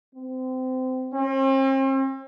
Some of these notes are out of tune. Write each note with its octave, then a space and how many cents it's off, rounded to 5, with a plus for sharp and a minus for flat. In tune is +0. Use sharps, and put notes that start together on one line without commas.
C4 -25
C4 +45